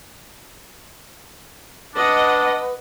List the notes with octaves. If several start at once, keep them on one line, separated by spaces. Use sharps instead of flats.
D4 B4 D#5 F#5